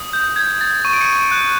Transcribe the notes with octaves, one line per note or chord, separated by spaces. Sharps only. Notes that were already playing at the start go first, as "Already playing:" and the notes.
Already playing: D#6
G6
G6 G#6
A6
C#6 D#7
D7
C#7 D#7
F#6